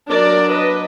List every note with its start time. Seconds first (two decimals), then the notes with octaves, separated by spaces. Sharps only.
0.10 F#3 D4 A#4 D5
0.53 B4 D#5